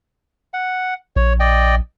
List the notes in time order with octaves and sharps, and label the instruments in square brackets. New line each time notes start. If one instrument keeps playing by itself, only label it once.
[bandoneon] F#5
[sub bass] A#1 [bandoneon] C#5
[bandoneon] D5 D#5 G5